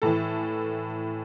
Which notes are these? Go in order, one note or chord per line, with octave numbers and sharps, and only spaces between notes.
A2 E3 A4